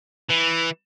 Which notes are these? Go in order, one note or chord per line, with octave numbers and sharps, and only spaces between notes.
E3